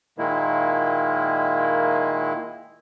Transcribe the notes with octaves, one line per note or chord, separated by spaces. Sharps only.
A#2 D#3 G#3 A#3 E4